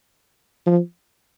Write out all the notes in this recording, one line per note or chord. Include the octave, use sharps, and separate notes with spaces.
F3